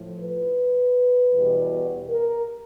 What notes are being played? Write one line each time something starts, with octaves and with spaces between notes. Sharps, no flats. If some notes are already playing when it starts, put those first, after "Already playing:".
Already playing: A2 F3
B4
E2 B2 G3
A#4